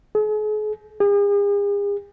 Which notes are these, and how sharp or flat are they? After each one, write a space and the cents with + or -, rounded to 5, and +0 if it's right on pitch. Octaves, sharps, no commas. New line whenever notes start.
G#4 +40
G#4 -45